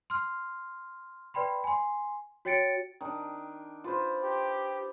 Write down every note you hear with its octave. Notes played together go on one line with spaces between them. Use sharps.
C6 F6
B4 D5 G5 B5 C6
G#5 C6
F#4 C#5 G5 A6 C#7 D7
D#3 D4
F4 B4 C5
G4